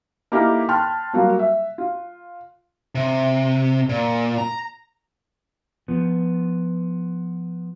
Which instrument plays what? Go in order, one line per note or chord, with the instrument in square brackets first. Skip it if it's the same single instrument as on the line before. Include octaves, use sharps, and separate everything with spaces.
[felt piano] A#3 D#4 E4 G4 A4 A#4
G5 A5 B5 C6 F6 F#6
F#3 G3 A#3 F4 F#4
E5
F4
[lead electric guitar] C3
A#2
A#5
[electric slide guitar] F3 B3